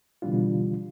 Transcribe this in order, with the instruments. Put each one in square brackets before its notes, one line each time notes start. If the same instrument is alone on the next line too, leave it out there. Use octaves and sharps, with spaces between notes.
[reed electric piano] B2 D3 E3 G3 D4 F4